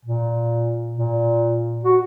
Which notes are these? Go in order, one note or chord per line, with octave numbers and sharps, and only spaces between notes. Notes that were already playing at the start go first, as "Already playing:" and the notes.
A#2
A#2
F#4